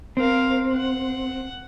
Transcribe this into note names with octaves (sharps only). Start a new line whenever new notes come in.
C4 A#4 F5
F#5